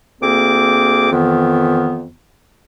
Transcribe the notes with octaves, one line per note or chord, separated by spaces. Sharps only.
D2 A#3 C4 G#4 D6
F2 D#3 E3 B3